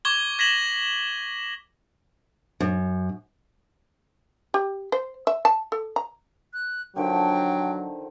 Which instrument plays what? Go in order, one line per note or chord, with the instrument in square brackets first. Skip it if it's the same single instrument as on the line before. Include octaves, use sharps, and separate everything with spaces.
[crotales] C#6 D6 G#6 G7
G#6 A#6 B6 E7 F#7 G7
[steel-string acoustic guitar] F#2
[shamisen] G4
C5
E5
A5
A4
A#5
[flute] F#6
[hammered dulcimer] D3 D#3 F3 [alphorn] F#3 [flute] G5